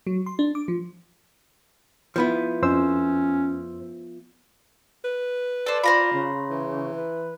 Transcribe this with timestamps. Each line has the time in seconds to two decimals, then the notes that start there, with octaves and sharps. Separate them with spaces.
0.07 F#3
0.26 C6
0.39 D4
0.55 D6
0.68 F3
2.16 F3 B3 E4
2.62 F2 C#4 C5 E6
5.04 B4
5.66 A4 C5 D5
5.84 F4 C5 A#5 B5
6.13 C#3
6.50 E3
6.95 B4